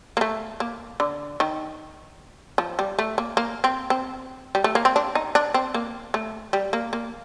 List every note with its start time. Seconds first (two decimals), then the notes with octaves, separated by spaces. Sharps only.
0.17 A#3
0.21 A3
0.60 A#3
1.00 D3
1.40 D#3
2.58 F3
2.79 G3
2.99 A3
3.18 A#3
3.37 A#3
3.64 C4
3.90 C4
4.55 G3
4.64 A3
4.75 A#3
4.85 C4
4.96 D4
5.15 D#4
5.35 D4
5.54 C4
5.74 A#3
6.14 A3
6.53 G3
6.73 A#3
6.93 A#3